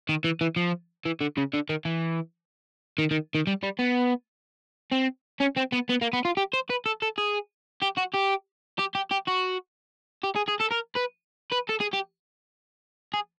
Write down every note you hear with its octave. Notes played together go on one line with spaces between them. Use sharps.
D#3
E3
E3
F3
E3
D3
C#3
D3
D#3
E3
D#3
D#3
D#3
G3
G3
B3
C4
C#4
C4
B3
B3
A#3
B3
F4
G4
C5
B4
A4
A4
G#4
G4
F#4
G4
G4
G4
G4
F#4
G4
G#4
G#4
A4
A#4
B4
B4
A4
G#4
G4
G#4